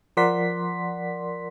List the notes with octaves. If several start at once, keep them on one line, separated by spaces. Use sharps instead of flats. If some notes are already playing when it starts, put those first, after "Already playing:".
F3 A#4 D5 F#5 C6 B6